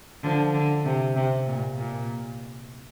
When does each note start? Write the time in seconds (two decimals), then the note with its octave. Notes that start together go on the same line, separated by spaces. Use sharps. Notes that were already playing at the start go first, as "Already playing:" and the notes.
0.24 D3 F3
0.54 D3
0.86 C3
1.16 C3
1.47 A#2
1.78 A#2